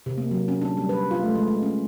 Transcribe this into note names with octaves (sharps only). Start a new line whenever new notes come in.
C3
A#3
F#3
C#4
D4
G3
B4
F4
A3
G#3
G#3
C#4